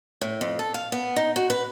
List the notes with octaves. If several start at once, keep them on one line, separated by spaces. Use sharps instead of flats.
A2
F2
A4
F5
B3
D#4
F#4
B4